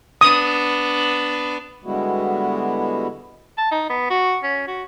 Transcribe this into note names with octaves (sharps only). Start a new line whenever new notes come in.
B3 D4 D#6
D3 G3 G#3 B3 E4 F#4
A5
D#4
B3
F#4
C#4
F#4